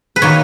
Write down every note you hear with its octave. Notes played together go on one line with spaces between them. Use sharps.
B4
D#3 A#3 C#5